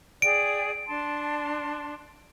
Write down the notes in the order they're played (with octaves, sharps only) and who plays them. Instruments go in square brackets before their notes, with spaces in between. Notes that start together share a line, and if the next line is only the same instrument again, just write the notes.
[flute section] G#4 D5 G5 [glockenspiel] D7
[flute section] D4 A5 C6